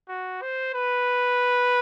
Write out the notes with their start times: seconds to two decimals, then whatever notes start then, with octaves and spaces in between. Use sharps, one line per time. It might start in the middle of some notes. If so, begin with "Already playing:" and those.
0.08 F#4
0.42 C5
0.74 B4